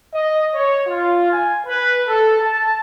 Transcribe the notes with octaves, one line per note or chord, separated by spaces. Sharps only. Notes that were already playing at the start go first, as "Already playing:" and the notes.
D#5
C#5
F4
G#5
B4
A4
A5